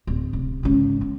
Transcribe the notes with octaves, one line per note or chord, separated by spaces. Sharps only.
D1
C3
G#2 C#3
B3